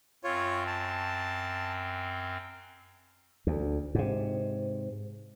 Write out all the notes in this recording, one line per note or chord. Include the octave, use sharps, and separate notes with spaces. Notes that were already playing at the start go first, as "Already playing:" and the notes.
F#2 C4 F4 C#5
A5
D2
G#2 C3